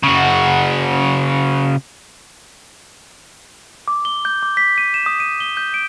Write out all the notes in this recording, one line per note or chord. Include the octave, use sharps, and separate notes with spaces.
C#3 F#4
D6
G7
G6
D6
B6
D#7
E7
D#6
D#7
G7
G6
D7